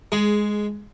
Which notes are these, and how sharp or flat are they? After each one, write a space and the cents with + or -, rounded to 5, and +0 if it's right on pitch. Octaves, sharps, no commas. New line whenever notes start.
G#3 +0 G#4 +15